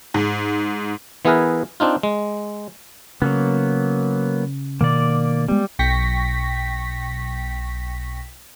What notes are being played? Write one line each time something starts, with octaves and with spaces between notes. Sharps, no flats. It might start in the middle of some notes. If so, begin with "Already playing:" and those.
G#2
E3 B3 E4 G#4 A#4 B4
C4 D4 D#4 F4
G#3
C#3 F#3 A#3 B3
B2 D#3 A#3 D5
G3 G#3 B3
B1 G5 C#6 A#6 B6